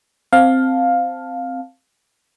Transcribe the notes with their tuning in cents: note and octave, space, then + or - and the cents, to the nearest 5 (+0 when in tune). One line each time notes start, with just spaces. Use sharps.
C4 +0 F5 +10 A5 +0